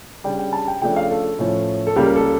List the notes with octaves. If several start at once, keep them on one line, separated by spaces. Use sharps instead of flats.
C#3 G3 D4 G5
G5
A5
G5
C#3 F3 A3 D4 G5
F5
A4
A2 F3 A3 C#4
A4
C#2 C#3 G3 A#3 G4
A#4
A4